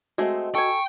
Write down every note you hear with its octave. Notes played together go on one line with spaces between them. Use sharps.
G#3 A3 C4 F#4 D#5
A4 G5 G#5 C#6